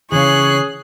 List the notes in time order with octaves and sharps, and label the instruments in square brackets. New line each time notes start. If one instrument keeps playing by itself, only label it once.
[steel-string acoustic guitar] C#3 E3 [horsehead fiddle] C#4 C#5 [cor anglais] G#4 [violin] F#6 C7